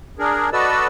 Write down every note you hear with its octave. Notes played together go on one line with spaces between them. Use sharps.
D4 G#4 A#4
F#4 A4 B4 D5 D#5 E6